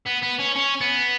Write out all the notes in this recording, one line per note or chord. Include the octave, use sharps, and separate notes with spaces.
B3
B3
C#4
C#4
B3